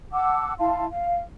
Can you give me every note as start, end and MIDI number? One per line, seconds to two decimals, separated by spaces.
0.12 0.53 78
0.12 0.53 81
0.12 0.53 86
0.12 0.53 88
0.58 0.85 64
0.58 0.85 77
0.58 0.85 81
0.58 0.85 84
0.90 1.18 77